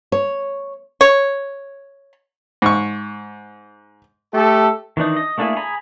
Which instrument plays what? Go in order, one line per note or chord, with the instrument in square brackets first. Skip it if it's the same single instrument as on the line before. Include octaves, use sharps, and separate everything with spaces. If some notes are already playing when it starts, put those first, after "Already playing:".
[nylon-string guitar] C#5
[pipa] C#5
[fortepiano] G#2 C#6
[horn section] A3 G4 A4
[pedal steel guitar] D#3 E3 D4 D#4
D#5
A3 A#3 D4 E4 G#4
G#4 G#5 A#5 B5